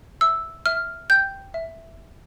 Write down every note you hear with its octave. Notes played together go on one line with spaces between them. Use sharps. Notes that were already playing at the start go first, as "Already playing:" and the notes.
E5 E6
E5 F6
G5 G6
E5